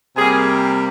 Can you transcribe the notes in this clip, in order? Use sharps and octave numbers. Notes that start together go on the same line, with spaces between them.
C3 G3 A#3 G#4